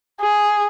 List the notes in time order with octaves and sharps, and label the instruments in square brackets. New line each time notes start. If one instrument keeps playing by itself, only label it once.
[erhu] G#4